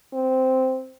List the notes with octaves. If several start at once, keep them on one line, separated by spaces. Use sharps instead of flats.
C4